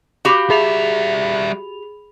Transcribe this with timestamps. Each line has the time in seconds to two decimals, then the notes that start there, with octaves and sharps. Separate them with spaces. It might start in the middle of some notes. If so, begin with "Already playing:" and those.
0.25 F#4 G4 F5 B5
0.50 G3 G#4 E5 B5 F7